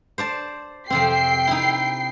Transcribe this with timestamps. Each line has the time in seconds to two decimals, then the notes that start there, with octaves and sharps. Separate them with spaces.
0.18 C5 D5 A5
0.90 F2 C3 C4 G5 C7
1.47 D#4 E4